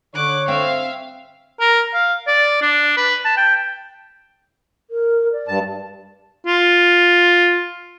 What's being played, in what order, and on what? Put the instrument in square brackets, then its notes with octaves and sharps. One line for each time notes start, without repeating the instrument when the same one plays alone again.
[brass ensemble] D3 C#5 [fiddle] D6 [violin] F#6
[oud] C4 [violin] E5 [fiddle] F5
[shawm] A#4
F5
D5
D4
B4
A5
G5
[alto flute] A#4
D5
[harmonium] G2 A5
[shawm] F4